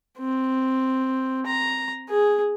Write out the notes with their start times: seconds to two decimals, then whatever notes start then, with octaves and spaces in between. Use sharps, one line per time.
0.19 C4
1.46 A#5
2.09 G#4